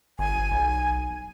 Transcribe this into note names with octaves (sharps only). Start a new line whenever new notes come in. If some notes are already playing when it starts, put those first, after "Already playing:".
G1 G#5
B1